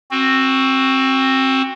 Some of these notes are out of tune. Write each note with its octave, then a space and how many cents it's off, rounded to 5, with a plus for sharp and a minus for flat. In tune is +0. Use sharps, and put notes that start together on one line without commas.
C4 +20 F#4 +0